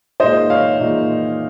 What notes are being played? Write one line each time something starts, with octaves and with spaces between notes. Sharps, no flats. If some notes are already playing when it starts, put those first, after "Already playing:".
A#2 G#3 D#4 C5 D#5
C#5 F5
A#2 G#3 D#4